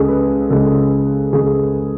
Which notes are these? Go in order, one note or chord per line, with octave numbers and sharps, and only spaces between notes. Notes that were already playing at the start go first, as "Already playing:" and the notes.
Already playing: C#2 C#3 G#3 G#4 A4
B4
C#2 C#3 G#3 A4
C#2 C#3 G#3 G#4